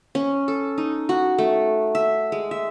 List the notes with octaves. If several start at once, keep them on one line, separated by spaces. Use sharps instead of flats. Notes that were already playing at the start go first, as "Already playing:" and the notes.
C#4
A4
D#4
F#4
A3
E5
G#3
E5